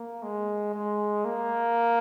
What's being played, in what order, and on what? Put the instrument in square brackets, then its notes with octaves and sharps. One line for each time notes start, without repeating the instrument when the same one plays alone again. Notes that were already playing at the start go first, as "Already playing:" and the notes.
Already playing: [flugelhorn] A#3
G#3
G#3
A#3